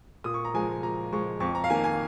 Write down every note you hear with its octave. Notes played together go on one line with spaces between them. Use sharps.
A#2 D#6
C#6
A#5
F3 G#3 G#5
A#2 A#5
F3 G#3 C#6
F2 C#6
A#5
F5
D#3 A#3 G#5
G#5